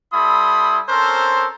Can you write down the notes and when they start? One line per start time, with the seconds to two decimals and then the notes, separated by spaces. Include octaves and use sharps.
0.13 G3 E4 A4 B5 C6 D#6
0.89 C4 C#4 A4 A#4 C5